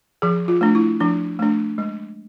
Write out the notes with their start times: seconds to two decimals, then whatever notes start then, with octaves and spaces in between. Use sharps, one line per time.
0.22 F3 G#4
0.48 F4
0.61 A3 D4
0.75 E4
1.00 F3 D4
1.39 A3 D4
1.78 G#3